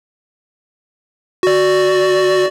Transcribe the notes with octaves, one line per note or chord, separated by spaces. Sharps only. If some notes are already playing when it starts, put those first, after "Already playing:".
F#4 D5